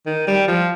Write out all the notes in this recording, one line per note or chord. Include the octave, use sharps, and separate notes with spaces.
D#3
G3
F3